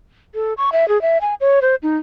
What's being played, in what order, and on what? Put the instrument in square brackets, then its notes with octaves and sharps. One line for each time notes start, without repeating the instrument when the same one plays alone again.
[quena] A4
C#6
E5
G#4
E5
G#5
C#5
C5
D#4